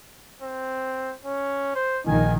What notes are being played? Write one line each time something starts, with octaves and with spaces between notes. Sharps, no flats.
C4
C#4
C5
A#1 D#3 G#5